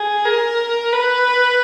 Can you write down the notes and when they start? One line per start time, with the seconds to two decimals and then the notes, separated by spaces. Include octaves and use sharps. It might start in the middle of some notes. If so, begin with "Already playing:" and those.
Already playing: G#4
0.25 A#4
0.93 B4